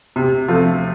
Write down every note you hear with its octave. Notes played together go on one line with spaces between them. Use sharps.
C3
F3 A3 C4 F4